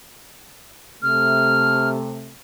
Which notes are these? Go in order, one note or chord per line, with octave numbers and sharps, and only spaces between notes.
C3 A3 F6